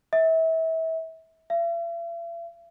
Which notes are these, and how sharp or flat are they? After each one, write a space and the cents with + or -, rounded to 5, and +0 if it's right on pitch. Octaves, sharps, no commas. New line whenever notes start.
E5 -30
E5 +45